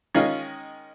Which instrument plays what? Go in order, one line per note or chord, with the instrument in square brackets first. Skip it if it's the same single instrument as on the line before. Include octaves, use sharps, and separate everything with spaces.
[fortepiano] D#3 G#3 C#4 F4